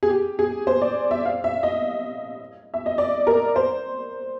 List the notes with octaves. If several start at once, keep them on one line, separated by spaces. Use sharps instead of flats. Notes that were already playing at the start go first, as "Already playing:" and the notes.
G#4
G4
G#4
C5
D5
E5
F5
E5
D#5
E5
D#5
D5
A#4
C5